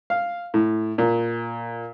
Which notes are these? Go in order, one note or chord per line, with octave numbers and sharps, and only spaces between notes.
F5
A2
A#2